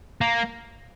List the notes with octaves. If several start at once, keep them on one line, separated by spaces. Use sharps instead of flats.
A#3